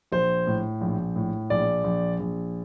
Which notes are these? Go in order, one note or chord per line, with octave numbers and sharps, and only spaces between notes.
A#1 C5
A2
A#1
A2
A#1 D5
A#1
A#1